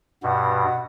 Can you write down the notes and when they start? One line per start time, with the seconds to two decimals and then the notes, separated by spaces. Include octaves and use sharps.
0.23 G2 B2 F#5